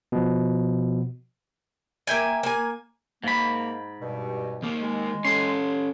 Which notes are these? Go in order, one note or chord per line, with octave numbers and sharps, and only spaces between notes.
B2 F3
A#3 E5 G5 G#5
A#3 G#5
G#2 A#3 B5
G2 B2
D#2 A#3
G#3
C#4 A4 C6